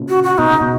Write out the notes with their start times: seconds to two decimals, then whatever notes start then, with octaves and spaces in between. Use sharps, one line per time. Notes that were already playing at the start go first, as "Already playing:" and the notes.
Already playing: A#2 C#3
0.09 F#4
0.23 F#4
0.38 B2 D#4
0.50 C#3
0.61 B2